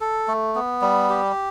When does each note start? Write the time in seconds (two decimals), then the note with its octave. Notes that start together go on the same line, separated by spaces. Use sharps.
0.01 A4
0.28 A3
0.55 B3
0.82 G3
1.10 G4